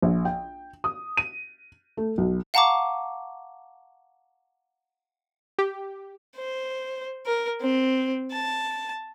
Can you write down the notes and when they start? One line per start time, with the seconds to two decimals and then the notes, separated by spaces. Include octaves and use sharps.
0.02 A#1
0.25 G5
0.84 D#6
1.17 D#7
1.97 A3
2.18 B1
2.54 F5 F#5 A5 A#5 C#6 D6
5.59 G4
6.37 C5
7.26 A#4
7.61 C4
8.32 A5